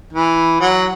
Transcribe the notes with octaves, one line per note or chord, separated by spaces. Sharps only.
E3
F#3